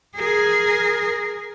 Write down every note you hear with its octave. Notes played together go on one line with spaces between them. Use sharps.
G#4 A#4